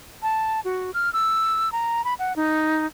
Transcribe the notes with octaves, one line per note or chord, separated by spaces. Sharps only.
A5
F#4
F6
E6
A#5
B5
F#5
D#4